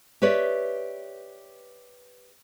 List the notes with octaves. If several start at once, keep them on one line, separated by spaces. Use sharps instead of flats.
G4 B4 C#5 D5 E5